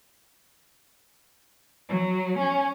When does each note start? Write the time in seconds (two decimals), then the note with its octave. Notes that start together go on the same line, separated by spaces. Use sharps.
1.89 F#3
2.39 C#4